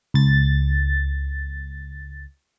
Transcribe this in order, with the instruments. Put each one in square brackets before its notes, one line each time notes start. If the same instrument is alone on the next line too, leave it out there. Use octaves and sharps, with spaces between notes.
[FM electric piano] C#2 A6